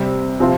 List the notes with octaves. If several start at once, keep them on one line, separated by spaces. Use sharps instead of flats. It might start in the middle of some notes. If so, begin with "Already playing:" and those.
Already playing: C3 G3 C4
C3 F3 C4 F4